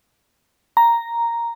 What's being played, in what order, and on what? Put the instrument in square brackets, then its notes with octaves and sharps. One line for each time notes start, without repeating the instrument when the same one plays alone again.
[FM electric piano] A#5